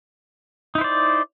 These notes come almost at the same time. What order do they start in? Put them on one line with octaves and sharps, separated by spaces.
D#4 E4 C5 D5